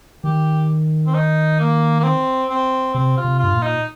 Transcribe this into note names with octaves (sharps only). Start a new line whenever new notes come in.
D#3 G4
C4
D#4
A#3
A#3
C4
C4
C3 C4
F4
C3
G2 F4
A#2
D#4